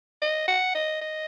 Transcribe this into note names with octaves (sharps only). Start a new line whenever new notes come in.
D#5
F#5
D#5
D#5